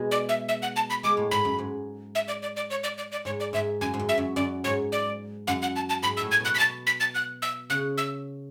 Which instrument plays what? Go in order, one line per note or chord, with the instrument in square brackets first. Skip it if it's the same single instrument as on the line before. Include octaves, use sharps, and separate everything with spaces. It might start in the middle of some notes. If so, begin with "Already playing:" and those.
Already playing: [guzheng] B2 G#3
[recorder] D5
E5
E5
F#5
A5
B5
[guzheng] G#3 [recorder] D6
[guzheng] A2
[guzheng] G#2 [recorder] B5
[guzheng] F#2
G#2
[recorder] E5
D5
D5
D5
C#5
D5
D5
D5
[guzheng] G#2 [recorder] C#5
[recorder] D5
[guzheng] G#2 [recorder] E5
[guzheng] F#2 [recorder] G#5
[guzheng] G#2
F#2
[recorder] E5
[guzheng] F#2
[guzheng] F#2 [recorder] D5
[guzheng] G#2 [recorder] C#5
[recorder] D5
[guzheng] F#2 [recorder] F#5
[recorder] F#5
A5
A5
[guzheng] G#2 [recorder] B5
[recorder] E6
[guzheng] A2
[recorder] G#6
[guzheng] B2 [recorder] F#6
[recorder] B6
[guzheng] B2 [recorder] A6
[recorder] B6
A6
F#6
E6
[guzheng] C#3 [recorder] F#6
[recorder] E6